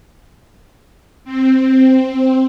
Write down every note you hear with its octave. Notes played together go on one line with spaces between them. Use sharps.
C4